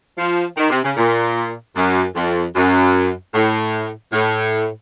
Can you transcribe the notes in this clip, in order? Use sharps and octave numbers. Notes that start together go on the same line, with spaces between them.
F3
D#3
C3
C#3
A#2
F#2
F2
F#2
A2
A2